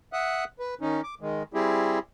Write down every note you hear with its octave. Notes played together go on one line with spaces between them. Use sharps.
E5 F#5 D#6 F#6
B4
D#3 C#4 D#4
D6
D#3 G#3
G3 C4 E4 G4 G#4